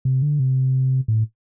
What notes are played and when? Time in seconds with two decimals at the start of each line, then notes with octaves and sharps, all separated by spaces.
0.05 C3
0.22 D3
0.39 C3
1.08 A2